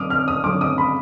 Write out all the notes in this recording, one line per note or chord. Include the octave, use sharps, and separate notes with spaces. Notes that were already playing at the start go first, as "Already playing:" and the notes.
Already playing: D3 F#3 D6 D#6 F6
F6
D#6
D3 F#3 D6
D#6
B5